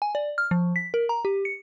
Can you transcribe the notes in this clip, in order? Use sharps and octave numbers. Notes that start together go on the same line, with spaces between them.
G#5
D5
F6
F3
B6
A#4
A#5
G4
C#7